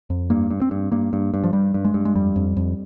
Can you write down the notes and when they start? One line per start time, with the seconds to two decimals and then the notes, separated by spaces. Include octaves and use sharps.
0.10 F2
0.30 G2 A#3
0.50 G2
0.61 C4
0.71 G2
0.92 G2 A#3
1.13 G2
1.34 G2
1.44 F3
1.53 G2 G3
1.74 G2
1.85 G#3
1.94 G2
2.05 G#3
2.15 F2 G3
2.36 F2
2.57 F2